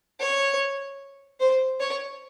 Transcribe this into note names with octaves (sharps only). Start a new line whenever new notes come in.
C#5
C5
C#5